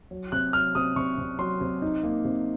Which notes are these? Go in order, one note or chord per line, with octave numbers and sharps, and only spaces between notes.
F#3
C3 F#6
F#3 F6
C3 D#6
C3 C#6
C3
F#3 C6
C3
D#4
A#3
C3